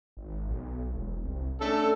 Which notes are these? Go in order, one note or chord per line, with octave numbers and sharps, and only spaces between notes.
G#1
B1
E1
C2
A3 C#4 D4 A4